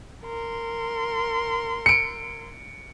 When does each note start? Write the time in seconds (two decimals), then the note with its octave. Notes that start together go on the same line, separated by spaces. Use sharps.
0.24 A#4 C6
1.86 C#7 D7